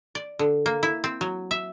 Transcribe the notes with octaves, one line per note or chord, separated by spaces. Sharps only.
D5
D3
A#3
E4
C4
F#3
E5